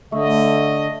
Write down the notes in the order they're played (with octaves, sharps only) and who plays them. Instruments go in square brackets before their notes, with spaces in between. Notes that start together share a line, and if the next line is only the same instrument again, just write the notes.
[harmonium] D3 [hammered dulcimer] A3 [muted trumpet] D#5